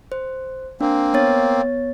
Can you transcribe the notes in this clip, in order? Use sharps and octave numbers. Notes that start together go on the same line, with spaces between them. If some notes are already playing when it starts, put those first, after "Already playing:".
C5
A#3 C4 D4
B3 C#5 A6